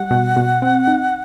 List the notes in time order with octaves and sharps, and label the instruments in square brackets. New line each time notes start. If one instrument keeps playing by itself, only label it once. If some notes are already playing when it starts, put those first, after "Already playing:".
Already playing: [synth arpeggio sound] G3 [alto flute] F#5
[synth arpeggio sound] B2
B2
C4
D#4